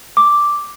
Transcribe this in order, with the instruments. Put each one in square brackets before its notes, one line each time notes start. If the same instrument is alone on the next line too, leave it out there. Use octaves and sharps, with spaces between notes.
[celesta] D6